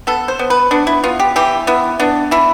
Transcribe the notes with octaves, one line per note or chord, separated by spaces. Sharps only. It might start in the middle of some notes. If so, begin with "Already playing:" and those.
B3 A4
C5
B3
B4
B3 D4
E4
B3 F4
G4
E3 G4
B3 E4
B3 D4
E3 E4